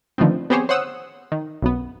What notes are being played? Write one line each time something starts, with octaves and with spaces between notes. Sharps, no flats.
D3 D#3 F3 A3 B3 C4
B3 C4 G4 G#4 C5 C#5
C5 C#5 F#5 D#6 E6
D#3
B1 F#2 B3